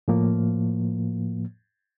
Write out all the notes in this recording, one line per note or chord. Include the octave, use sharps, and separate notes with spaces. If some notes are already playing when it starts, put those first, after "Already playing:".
A2 F3 A#3